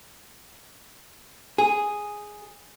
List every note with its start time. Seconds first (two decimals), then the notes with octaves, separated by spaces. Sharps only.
1.58 G#4